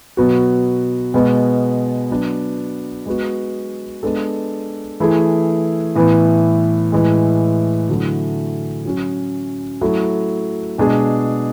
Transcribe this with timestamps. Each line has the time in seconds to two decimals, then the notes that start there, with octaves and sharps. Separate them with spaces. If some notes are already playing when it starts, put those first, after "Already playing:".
0.17 B2 F#3 B3 F#4
1.14 B2 G#3 B3
2.10 F#3 B3 D4
3.06 G#3 B3 F#4
4.03 G#3 B3 D4 A4
5.00 E3 A3 E4 G#4
5.95 A2 E3 B3 E4
6.92 A2 E3 G#3
7.89 D3 F#3 A3 E4
8.85 F#3 C#4 F#4
9.81 F#3 A3 E4 A4
10.78 B2 G#3 D4 G#4